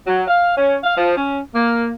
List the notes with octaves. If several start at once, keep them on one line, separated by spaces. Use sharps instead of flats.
F#3
F5
C#4
F5
F3
C#4
A#3